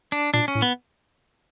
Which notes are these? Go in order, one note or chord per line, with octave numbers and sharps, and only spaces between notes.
D4
A#2 D4
C#4
A2
B3